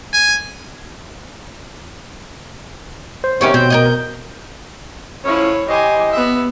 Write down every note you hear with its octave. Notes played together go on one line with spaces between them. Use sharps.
G#5
C5
C3 D#3 B3 C#4 G4 C#5
B2 C4 G6
A#4 C#5 D#5
A2 F3 C#4 E4 C#5
E3 G4 C5 D#5 G#5
B3 E5